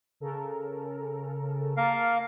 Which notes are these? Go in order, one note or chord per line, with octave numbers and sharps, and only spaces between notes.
C#3 A4 A#4
A#3 A#4 F5 A5